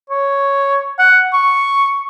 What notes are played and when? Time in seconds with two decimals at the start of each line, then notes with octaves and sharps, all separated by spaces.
0.10 C#5
0.99 F#5
1.33 C#6